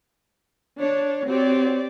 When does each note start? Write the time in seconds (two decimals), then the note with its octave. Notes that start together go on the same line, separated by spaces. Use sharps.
0.79 D4 C#5
1.27 C4 F#4 G4 C#5 D5